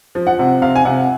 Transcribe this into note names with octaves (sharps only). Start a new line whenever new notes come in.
F3
F#5
C3
C3 F5
G#5
C3 F#5